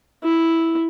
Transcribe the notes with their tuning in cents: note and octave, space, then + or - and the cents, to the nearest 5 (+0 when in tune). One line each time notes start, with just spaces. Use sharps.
E4 -5